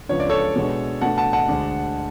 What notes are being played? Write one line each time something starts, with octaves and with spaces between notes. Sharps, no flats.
C#2 C#3 F3 B3 D4 C#5
D5
A4 C#5
B2 G#3 D4
B2 A3 D4 F#5 A5
F#5 A5
F#5 A5
D2 D3 G#3 D4